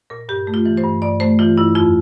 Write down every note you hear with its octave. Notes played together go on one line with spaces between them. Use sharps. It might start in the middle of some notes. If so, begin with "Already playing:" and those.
A#2 A#4
G2 G4
A3
F4
E3
C5
G2
G2 D5
A3 C5
E3 F4
G2 E4
F2 F4